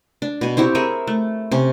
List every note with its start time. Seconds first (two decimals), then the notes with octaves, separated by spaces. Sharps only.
0.22 D4
0.41 B2 G#5
0.57 C4 E4 G4 C#5
0.75 G#4 A#4 C#5 E5
1.07 A3
1.51 C3 C#4